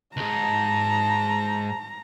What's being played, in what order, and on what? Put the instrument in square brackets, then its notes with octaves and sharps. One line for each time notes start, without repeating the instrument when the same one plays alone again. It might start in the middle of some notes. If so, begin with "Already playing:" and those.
[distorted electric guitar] C#2 G#2 [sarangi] A5 [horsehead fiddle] A#5